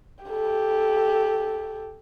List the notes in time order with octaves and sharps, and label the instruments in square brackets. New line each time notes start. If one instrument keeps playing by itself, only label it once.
[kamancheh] G4 A4